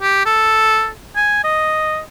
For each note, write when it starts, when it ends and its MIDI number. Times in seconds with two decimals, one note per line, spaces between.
0.02 0.24 67
0.26 0.89 69
1.16 1.39 80
1.44 2.00 75